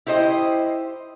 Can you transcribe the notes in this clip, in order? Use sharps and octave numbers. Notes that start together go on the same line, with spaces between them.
E4 G4 C5 D#5